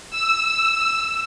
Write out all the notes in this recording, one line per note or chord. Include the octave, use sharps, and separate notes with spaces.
E6